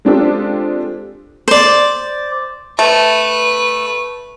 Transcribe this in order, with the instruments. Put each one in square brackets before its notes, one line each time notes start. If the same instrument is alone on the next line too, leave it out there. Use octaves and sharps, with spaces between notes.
[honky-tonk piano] G#3 C4 D4 F4 G4 A4
[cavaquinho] C5 D5
[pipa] A3 [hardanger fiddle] B4